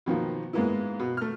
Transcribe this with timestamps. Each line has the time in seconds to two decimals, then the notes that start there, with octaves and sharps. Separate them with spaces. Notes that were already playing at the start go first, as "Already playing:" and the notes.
0.06 B2 D#3 F3 A#3
0.53 G#2 G#3 A#3 B3 E4
1.00 B2
1.17 A3 F6